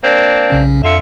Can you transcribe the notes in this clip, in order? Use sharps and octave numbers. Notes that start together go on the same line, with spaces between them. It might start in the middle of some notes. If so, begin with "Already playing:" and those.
A#3 C4 D4
B1 C#3 C#4
F2 D3 F4 E5 C#7